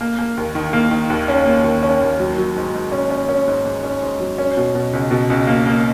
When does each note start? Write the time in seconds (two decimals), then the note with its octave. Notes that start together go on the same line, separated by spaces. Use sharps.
0.01 A#3
0.19 A#3
0.37 D#2
0.55 D#3
0.73 A#3
0.91 D#3
1.10 D#2
1.28 C#4
1.46 A#3
1.64 D#2
1.83 C#4
2.01 D#2
2.20 F#3
2.38 F#3
2.56 G#2
2.74 G#2
2.92 C#4
3.10 C#4
3.29 C#4
3.48 G#2
3.65 G#2
3.83 C#4
4.01 G#2
4.20 F#3
4.38 C#4
4.57 B2
4.75 B2
4.93 C#2
5.11 B2
5.30 C#2
5.47 A#3
5.66 A#3